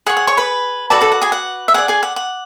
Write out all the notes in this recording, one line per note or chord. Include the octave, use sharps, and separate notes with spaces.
G#4 C#5 F#5
F#5
C#5 C#6
B4 B5
F#4 A4 B4 D5 A5
A4 A5
F#5
G#4 G#5
F#5
E5
G#4 D5 F#5
G#4 G#5
F#5
F#5